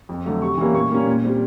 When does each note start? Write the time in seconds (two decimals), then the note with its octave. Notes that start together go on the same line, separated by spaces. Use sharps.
0.09 F2
0.25 D3 F#3 A3
0.42 C3 C#6
0.57 E3 G3 A#3 C#4
0.73 A#2 C#6
0.90 G3 A#3 C#4
1.06 A#2
1.24 G3 C4